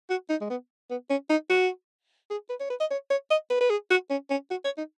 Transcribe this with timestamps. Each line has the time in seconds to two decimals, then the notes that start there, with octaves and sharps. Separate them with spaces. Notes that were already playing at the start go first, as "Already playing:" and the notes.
0.10 F#4
0.30 D#4
0.41 G#3
0.50 B3
0.90 B3
1.10 C#4
1.30 D#4
1.50 F#4
2.31 G#4
2.50 B4
2.60 C#5
2.70 B4
2.80 D#5
2.91 C#5
3.10 C#5
3.31 D#5
3.50 B4
3.61 B4
3.70 G#4
3.91 F#4
4.10 C#4
4.30 C#4
4.51 F#4
4.65 C#5
4.78 D#4